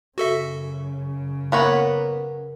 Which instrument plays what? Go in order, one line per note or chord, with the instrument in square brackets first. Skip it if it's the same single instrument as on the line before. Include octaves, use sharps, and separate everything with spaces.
[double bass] F#2 C#3 [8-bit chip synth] F#4 A4 E5
[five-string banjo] A#3 B3 C#5 [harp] A#4 B4 F#5